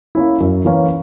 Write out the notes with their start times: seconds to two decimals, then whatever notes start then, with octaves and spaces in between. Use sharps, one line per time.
0.15 A#3 C#4 E4
0.40 F#2
0.65 E3 A#3 C#4